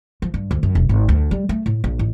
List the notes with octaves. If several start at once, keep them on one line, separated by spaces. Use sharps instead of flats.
F3
G2
D2
F#2
E1
G#1
D2
G3
A3
A2
A#1
A1